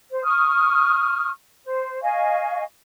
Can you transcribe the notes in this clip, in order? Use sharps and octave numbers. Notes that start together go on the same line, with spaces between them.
C5
C#6 D#6 F6
C5
D#5 F5 G#5 C#6